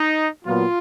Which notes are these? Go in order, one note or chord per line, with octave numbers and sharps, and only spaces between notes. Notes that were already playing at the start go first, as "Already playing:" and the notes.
Already playing: D#4
A#2 F#3 B3 F4